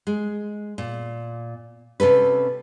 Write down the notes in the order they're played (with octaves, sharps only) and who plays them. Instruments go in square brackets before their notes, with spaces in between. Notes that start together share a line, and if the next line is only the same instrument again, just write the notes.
[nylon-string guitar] G#3
A#2
C3 C#4 A4 B4